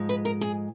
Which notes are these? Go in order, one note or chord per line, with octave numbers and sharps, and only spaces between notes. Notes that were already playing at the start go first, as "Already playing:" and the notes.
Already playing: G#2 F3 G#3
B4
A#4
G#4